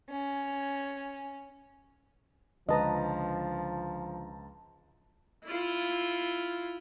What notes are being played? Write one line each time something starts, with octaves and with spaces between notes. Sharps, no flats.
C#4
C#2 D3 F3 B4 D#5 A5 A#5
E4 F4